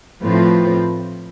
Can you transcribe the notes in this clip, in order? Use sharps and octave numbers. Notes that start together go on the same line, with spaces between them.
A2 F3 C4 F4 B4